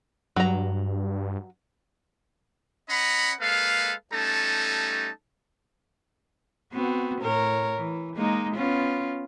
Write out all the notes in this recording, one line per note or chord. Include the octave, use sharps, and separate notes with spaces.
G2 F#3 A#5
C#4 D#5 F#5 A#5 B5
G#3 A#3 A4 B4 F5
G3 A3 C#4 D#4 A4 A5
B3 C4 F#4
A2 A#4 C#5
E3
G#3 A#3 D#4
B3 C#4 F4